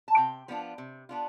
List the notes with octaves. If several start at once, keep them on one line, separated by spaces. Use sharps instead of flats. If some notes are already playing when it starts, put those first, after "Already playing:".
A5
C3 G5
F3 B3 D4 F4
C3
B3 D4 F4